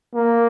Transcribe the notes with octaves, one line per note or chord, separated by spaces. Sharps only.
A#3